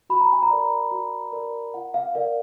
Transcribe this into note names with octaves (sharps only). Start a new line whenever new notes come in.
F#4 B5
A#5
G#5
A#5
A#4 D5
F#4
A#4 D5
F4 F#5
F5
A#4 D5 F5